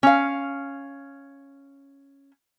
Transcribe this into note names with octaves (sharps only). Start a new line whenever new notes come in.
C#4 F5